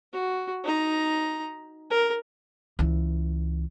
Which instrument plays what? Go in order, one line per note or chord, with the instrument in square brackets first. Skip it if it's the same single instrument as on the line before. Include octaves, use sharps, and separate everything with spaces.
[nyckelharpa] F#4
D#4 A#5
A#4
[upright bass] C#2 E3